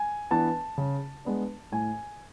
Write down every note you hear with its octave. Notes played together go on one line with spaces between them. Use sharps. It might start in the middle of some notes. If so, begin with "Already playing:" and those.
Already playing: G#5
E3 B3 D4 A5
C#3
G#3 B3 D4
A2 G#5